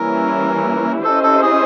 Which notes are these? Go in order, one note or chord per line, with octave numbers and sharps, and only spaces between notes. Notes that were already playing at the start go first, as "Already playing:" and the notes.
Already playing: E3 G3 A#3 C#4 E4 A#4
C#4 E4 G4 A4 C5 D#5
A4
G#4